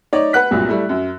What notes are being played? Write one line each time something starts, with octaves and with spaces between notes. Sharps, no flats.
D#4 C#5 D5
B4 F#5 F#6 B6
C2 G2 A#2 F#3
G3 A3 E4
F#2